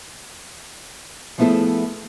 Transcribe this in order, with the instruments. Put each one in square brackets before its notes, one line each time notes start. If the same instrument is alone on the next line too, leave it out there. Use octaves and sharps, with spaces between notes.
[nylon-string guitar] F3 A3 B3 E4 G#4 A4